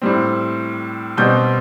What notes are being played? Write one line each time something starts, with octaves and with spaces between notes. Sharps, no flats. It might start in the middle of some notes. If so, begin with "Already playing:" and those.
A2 G3 C4
B2 G3 C4 G6